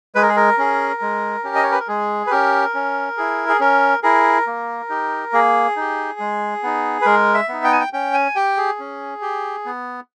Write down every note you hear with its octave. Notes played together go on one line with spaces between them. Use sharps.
G#3 B4
A#4
G#4
A#4
C#4 G#4
G#3
C#4 G4
D#5
C#5
B4
A#4
G#3 G#4
B4
C#4 G4 A#4
C#4
E4 G#4
G#4
C#4 A#4
E4 G#4 A#4
A#3
D#4 G4
A#3 G#4
D#4 G4
G#3
B3 D#4
B4
G#3 A#4
E5
B3 D#4
G5
G#5
G5
C#4 G5
G#5
G4 G5
G#4
C#4
G4
B3